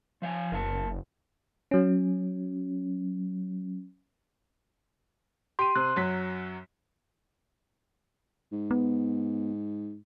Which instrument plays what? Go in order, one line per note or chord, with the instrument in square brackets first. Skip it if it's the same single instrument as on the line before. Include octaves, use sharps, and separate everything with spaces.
[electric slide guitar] F3 F5 G#5
[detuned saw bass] F#1 [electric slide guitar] A#4 E5 A5
[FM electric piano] F#3 C#4
[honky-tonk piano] G4 D#7 [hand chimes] C6
[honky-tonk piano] C3 [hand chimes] F#6
[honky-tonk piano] F#2 F#3 B6
[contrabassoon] G#2
[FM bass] B3